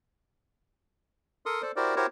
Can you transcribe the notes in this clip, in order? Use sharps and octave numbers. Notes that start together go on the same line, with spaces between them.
A4 A#4 C6 D#6
A4 C5 D5
E4 F#4 G4 A#4 C5 D5
E4 F#4 G4 A#4 C5 C#5